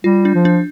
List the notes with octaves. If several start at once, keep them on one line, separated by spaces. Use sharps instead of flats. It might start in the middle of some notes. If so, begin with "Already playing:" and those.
G3 F4
D4
F3
D4